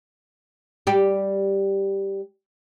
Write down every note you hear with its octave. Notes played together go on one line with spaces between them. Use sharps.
G3 G4